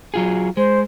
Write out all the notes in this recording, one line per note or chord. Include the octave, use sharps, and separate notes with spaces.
F#3 F4 G#4
G#3 C5